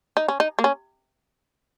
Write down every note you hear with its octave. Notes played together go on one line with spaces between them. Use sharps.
D#4
C#4
D#4
A#3
C#4